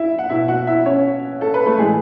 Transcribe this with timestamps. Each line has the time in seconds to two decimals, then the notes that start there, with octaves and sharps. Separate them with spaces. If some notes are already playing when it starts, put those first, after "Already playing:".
Already playing: E4 E5
0.18 F#5
0.30 B2 E4 E5
0.48 F#4 F#5
0.67 E4 E5
0.85 C#4 C#5
1.41 A4
1.54 B4
1.66 A3 A4
1.78 A2 E3 G#3 G#4